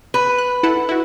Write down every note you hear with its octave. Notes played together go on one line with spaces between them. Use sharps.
B4
F#6
E4 A4 F#5
E4 F#4